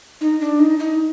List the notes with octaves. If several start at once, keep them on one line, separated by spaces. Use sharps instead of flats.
D#4
D4
D#4
D#4